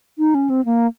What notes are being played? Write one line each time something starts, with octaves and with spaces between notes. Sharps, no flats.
D#4
C#4
C4
A#3